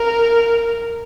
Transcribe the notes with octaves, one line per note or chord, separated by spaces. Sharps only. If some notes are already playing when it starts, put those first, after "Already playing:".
Already playing: A#4